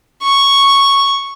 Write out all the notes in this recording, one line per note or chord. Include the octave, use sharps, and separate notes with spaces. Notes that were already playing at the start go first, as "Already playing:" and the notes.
C#6